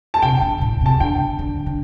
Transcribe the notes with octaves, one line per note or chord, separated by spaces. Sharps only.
A5
C3 G5
D3
A2
C3 A5
D3 G5
D3
D3